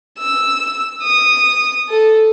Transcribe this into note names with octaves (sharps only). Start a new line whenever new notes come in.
E6
D#6
A4